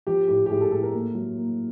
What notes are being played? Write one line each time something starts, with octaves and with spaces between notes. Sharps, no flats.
F3 G4
A2 G4
G4
A2 G#4
A4
A2 A4
A#4
A#3
F#3
A#3